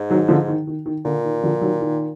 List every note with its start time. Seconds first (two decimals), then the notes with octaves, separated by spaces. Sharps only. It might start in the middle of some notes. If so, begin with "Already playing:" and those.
Already playing: G#2
0.10 D#3 F#3
0.28 D3 F3
0.48 D#3
0.67 D#3
0.86 D#3
1.05 A#2 D3
1.24 D#3
1.43 D3 F3
1.61 D#3 F#3
1.81 D#3